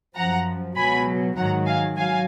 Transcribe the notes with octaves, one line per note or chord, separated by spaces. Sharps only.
F#2 F3 F#5 A#5
C#2 B2 F#3 G#5 B5
G#2 D#3 F#3 F#5 A#5
F5 G#5
F#3 F5 G#5